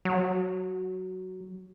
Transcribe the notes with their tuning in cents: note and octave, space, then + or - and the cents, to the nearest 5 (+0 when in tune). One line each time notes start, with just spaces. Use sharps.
F#3 +5